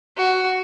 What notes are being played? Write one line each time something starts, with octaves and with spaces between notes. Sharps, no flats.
F#4